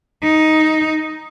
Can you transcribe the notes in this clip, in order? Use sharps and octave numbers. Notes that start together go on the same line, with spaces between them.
D#4